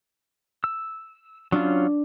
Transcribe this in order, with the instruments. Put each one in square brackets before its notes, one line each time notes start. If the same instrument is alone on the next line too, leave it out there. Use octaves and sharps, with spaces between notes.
[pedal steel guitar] E6
[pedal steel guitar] F#3 C#4 F4 [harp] D4